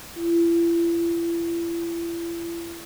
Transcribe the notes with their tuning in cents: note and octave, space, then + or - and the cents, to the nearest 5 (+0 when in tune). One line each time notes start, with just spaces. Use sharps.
E4 +40